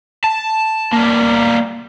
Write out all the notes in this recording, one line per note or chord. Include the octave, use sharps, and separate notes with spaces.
A5
G3 A#3